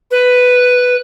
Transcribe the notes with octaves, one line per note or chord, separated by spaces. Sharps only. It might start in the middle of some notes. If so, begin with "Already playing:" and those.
B4